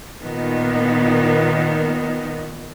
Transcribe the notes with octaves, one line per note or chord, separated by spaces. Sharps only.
A#2 D#3 B3